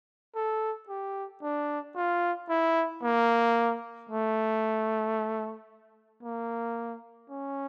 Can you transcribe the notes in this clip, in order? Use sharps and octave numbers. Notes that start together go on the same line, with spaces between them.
A4
G4
D4
F4
E4
A#3
A3
A#3
C#4